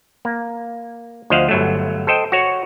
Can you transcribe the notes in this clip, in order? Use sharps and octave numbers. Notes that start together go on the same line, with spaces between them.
A#3
D2 F3 C5 D#5 F5 F#5
G1 F#3 A3
A4 C5 D#5 G5
F#4 C#5